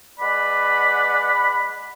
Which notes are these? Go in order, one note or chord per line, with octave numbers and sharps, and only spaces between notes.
G#3 B4 D5 F#5 B5